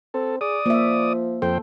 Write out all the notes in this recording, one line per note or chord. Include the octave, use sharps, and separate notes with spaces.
C4 A4
G#4 D5 D#6
F3 A#3 E5
F2 A4 C5 G5